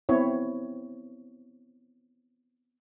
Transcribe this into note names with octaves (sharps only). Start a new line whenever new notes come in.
B3 C4 E4 C#5